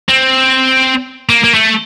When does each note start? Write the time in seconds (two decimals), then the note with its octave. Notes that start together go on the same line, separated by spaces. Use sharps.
0.09 C4
1.29 A#3
1.44 A#3
1.54 A3